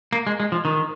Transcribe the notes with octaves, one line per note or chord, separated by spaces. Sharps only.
A#3
G#3
G#3
F3
D#3